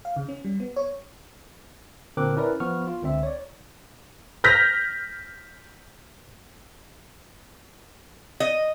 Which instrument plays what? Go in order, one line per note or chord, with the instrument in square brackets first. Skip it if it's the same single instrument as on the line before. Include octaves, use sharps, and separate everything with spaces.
[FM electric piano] F5
C#3
C#4
G3
B3
C#5
[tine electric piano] A#2 D3 C4 A#4 D6 F#6
C#4 E4 A#4 B4 D5
F3 B3 C#6 F6
F4
C#2 D3 C4 E5
C#5 D5
[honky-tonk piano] F6 G6 A#6 B6
[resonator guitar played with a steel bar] D#5